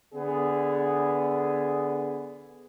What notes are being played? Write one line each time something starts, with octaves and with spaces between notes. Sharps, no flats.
D3 B3 G#4